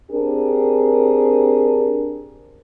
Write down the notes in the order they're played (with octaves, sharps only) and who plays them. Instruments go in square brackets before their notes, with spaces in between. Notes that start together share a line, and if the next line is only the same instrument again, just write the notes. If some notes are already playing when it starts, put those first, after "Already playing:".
[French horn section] C4 D4 G4 G#4 A#4